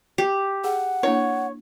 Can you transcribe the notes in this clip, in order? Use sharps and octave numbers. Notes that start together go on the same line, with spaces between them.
G4
G#4 F#5
A#3 D4 E4 C#5